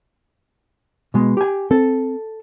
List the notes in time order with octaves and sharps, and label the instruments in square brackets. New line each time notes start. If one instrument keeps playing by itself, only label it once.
[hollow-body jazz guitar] B2 G#3
G4 G#5
[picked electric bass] C4 [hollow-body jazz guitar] A4